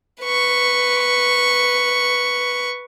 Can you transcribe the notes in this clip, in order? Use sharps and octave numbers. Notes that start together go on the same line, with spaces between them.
B4 C#6